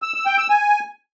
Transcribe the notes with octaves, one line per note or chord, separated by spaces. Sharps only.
E6
E6
G5
E6
G#5